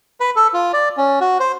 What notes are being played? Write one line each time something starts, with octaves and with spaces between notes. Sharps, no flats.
B4
A4
F4
D5
C#4
F#4
C5